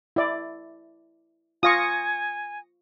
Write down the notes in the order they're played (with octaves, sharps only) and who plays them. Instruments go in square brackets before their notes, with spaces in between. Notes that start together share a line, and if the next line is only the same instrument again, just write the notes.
[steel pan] E4 D5
[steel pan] F4 F5 C#6 [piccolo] G#5 [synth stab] D#6 A#6 C#7